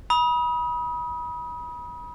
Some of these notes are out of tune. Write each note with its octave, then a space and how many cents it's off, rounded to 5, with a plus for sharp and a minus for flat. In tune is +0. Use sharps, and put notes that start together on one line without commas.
B5 -35 D#6 +25